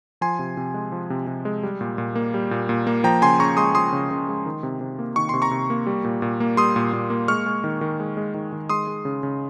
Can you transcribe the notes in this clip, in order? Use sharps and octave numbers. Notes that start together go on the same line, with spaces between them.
F3 G#5 C6
C3
C3
G#3
F3
C3
C3
G#3
G3
A#2
A#2
A#3
G3
A#2
A#2
A#3
F3 G5 A#5
C#3 G#5 C6
C#3 A#5 C#6
G#3 C6 D#6
F3 C6 D#6
C#3
C#3
G#3
D#3
C3
C3
A#3
D#3 C#6
C3 C6
A#5 C#6
C3
A#3
G3
A#2
A#2
A#3
G3 C6 D#6
A#2
A#2
A#3
G#3 C#6 F6
G#3
D#3
D#3
G#3
G#3
D#3
D#3
G#3 C6 D#6
G#3
C#3
C#3